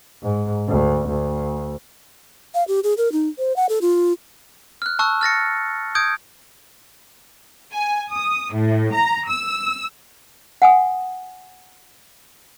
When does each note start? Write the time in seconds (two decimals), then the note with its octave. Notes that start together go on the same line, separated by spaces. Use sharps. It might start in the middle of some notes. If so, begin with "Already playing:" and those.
0.22 G#2
0.68 D2
1.08 D2
2.54 F5
2.68 G4
2.83 G#4
2.97 A#4
3.12 D#4
3.38 C5
3.56 F#5
3.69 A4
3.81 F4
4.82 F6 F#6
4.99 A5 C#6 E6 F#6
5.21 F6 A6 A#6 C#7
5.95 D#6 G6 G#6 D7
7.73 G#5
8.12 D#6
8.52 A2
8.94 A#5
9.30 E6
10.62 F#5 G#5 D#6